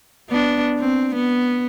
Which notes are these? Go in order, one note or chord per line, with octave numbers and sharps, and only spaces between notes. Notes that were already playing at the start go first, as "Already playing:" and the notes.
B3 D4
C4
B3